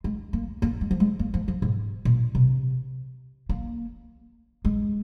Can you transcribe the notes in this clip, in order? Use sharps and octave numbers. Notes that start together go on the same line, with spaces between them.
G#3
A#3
A#3
G#3
F3
G#3
A#3
F3
F3
G#2
A#2
C3
A#3
G#3